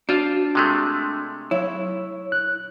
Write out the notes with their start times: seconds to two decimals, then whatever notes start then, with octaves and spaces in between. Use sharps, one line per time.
0.09 D4 F4 F#4 C5
0.55 C3 G#3 A3
1.51 F#3 E4 C#5
2.32 F#6